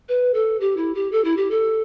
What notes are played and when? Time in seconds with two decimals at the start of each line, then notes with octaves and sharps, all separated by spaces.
0.09 B4
0.34 A4
0.61 G4
0.77 E4
0.95 G4
1.12 A4
1.25 E4
1.37 G4
1.51 A4